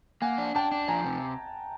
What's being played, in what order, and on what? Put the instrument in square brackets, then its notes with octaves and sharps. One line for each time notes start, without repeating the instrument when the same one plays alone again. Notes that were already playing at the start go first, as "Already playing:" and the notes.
[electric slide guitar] A#3 [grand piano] F#5 G#5
[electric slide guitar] D4
[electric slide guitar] D4 [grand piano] G5 A5
[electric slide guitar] D4
[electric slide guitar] F3 [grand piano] G#5 A#5
[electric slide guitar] C3